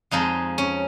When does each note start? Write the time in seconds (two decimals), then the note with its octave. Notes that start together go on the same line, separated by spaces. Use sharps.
0.11 F2 F3 G#3 D#4
0.58 C#4